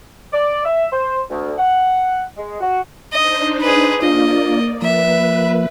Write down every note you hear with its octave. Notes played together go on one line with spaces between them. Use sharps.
D5
E5
C5
D2
F#5
G#3
F#4
D4 D#4 C5 D#5
G#4 B4
A#3 D4 F4 D5 D#5
F3 A#3 B4 E5